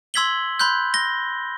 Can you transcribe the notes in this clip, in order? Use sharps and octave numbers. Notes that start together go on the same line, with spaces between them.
C6 E6 G#6 B6 F#7 G7
B5 C6 F#6 G6
A#6 G7